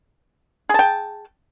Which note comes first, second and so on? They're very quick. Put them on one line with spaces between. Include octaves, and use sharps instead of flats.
G#4 A5 G5